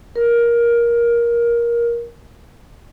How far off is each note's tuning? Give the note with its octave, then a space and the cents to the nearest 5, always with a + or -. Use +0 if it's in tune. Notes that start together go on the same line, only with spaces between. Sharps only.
A#4 +15